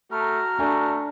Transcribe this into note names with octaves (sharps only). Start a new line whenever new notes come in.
A3 F#4 A#5 F6
A3 D4 G#5